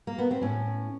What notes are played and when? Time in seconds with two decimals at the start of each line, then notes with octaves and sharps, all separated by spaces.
0.07 A#3
0.18 B3
0.31 C4
0.41 A2 C#4